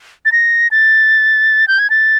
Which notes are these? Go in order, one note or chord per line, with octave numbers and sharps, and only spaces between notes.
A6
A#6
A6
G6
G#6
A6